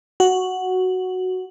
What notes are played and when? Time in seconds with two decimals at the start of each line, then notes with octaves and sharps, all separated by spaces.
0.20 F#4